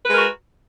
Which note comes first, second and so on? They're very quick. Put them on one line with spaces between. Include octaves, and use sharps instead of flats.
B4 G#3 A#4 F#4